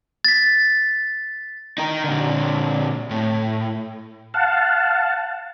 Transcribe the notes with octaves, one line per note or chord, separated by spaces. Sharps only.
A6 B6
D#4 A#4
A#2 D3
A2
F5 F#5 A5